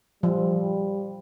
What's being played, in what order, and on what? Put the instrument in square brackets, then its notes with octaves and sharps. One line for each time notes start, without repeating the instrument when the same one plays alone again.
[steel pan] F3 [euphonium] G3